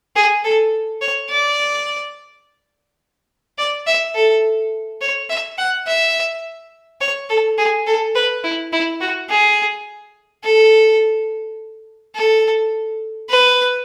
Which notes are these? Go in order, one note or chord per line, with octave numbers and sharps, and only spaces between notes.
G#4
A4
C#5
D5
D5
E5
A4
C#5
E5
F#5
E5
C#5
A4
G#4
A4
B4
E4
E4
F#4
G#4
A4
A4
B4